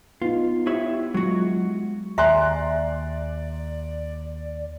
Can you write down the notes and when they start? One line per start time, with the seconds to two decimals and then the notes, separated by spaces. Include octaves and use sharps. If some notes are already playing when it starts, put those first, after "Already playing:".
0.22 B3 D#4 F4
0.67 E4 G4 C#5
1.14 F#3 G#3 F4 F#4
2.18 D#2 D5 E5 G#5 A#5 C6 F#6